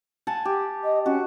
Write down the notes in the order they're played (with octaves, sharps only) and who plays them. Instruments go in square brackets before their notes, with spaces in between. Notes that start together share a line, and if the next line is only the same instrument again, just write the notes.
[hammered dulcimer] F#5 G#5 A5
G4
[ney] D#5
[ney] C#4 [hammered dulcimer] F#4